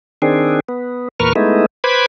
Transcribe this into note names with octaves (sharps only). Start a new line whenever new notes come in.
D#3 C4 D4 G#4
B3
E2 A#2 A#4 B4 C#6 F6
G#3 A3 B3 D#4 E4
B4 C5 B5 D6 G#6